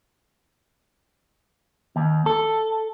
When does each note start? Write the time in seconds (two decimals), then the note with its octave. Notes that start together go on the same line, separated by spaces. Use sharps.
1.96 D#2
2.26 A4